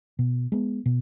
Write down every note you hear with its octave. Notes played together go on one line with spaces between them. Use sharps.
B2
G#3 B3
B2